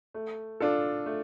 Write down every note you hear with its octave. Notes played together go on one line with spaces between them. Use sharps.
A3
D4 F4 A4
A3